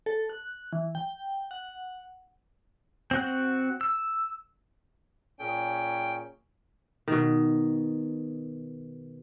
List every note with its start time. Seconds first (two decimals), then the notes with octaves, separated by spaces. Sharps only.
0.06 A4
0.29 F#6
0.73 E3
0.95 G5
1.51 F#5
3.11 C4 F#4 F#6
3.81 E6
5.39 A#2 C#4 G#4 G5
7.08 B2 D#3